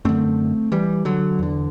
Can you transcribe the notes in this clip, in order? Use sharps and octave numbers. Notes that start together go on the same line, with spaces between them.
F#2 D3 A3 C4
E3 G3
D3 F#3
E2 D3